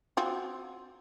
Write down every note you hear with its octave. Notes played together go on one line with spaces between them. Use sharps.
C4 F4 F#4